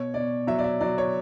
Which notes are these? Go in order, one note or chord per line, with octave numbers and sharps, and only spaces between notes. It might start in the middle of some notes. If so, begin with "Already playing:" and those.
Already playing: B2 C#5
B2 D5
F#3 E5
D5
E5
F#3 D5
C#5